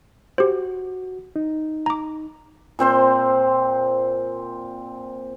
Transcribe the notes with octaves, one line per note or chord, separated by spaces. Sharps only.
F#4 G4 C5
D#4
A#5 D6
A#2 C4 C5 C6